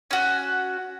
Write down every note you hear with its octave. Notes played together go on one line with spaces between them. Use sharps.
C#4 F#4